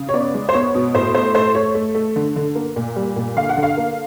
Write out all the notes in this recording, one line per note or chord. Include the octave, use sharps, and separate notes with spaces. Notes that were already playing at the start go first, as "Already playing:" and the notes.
Already playing: C#3
C#5
B3 D5
G#3
C5
B3 C#5
B2
A2 C5
A3 C5
A3 C5
A3 C#5
A3
A3
D3
D3
A#3
A#2
G3
A#2
D3 F5
F#5
D3
F5
A#3